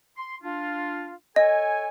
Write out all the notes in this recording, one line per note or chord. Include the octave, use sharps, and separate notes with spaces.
C6
D4 F4
A4 C#5 D#5 G#5